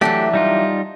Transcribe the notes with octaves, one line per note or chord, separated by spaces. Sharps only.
E3 F#3 A3 D4 G4
G3 D#4 F4